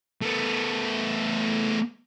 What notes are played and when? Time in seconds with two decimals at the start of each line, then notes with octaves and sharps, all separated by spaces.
0.21 A3 B3